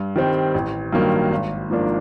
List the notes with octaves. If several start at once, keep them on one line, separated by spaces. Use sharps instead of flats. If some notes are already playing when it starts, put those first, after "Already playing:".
Already playing: G2
D#3 G3 C4
A1
G2 D#3 F#3 A#3
G#1
G#2 F3 A#3 D4